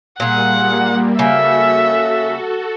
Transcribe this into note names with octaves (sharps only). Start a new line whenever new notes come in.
A#2 G3 A#3 G#4 F#5
C#3 A#3 F#4 A4 E5